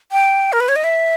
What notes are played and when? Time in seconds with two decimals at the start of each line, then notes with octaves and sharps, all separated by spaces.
0.12 G5
0.53 A#4
0.60 B4
0.68 C#5
0.76 D#5
0.84 E5